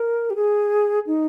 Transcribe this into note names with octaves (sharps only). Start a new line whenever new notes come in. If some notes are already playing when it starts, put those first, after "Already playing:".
Already playing: A#4
G4
G#4
D#4